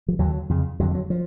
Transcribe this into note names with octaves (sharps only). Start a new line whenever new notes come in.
F3
D#2 D3 F#3
F2 C#3
F2 D3 F#3
F#3
F3